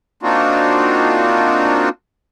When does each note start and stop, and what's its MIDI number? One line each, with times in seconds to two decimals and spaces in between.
0.23 1.89 58
0.23 1.89 60
0.23 1.89 62
0.23 1.89 63
0.23 1.89 65
0.23 1.89 66